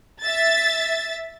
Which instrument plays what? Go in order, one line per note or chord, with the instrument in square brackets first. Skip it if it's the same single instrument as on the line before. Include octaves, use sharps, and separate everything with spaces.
[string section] E5 A6